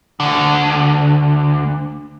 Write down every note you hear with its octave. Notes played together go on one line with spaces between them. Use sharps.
D2 D3